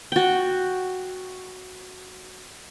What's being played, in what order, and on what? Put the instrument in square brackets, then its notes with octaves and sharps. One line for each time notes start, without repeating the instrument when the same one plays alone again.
[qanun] F#4 G5